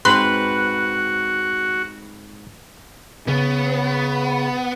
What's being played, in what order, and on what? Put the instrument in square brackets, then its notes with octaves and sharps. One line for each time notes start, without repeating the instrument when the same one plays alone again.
[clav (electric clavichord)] G#2 C4 [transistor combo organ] F#4 [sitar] B4 [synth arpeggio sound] C6
[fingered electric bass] C#3 [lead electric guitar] B3